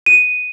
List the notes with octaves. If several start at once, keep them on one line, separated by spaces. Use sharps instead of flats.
D#7